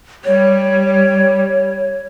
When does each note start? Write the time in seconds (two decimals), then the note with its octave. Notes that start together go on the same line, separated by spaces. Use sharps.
0.25 G3 C#5